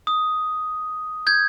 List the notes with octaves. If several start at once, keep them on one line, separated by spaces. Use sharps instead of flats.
D#6
G6 G#6